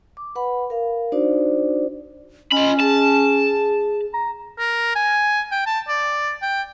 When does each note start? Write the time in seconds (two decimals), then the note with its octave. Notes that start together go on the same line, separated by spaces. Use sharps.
0.17 D6
0.35 B4 F#5 B5
0.70 A#4 F5
1.12 D4 D#4 F#4 C5 D5
2.52 C#4 F4 D#5 B5
2.80 G#4 A5
4.14 A#5
4.59 A#4
4.96 G#5
5.52 G5
5.66 A5
5.88 D5
6.42 G5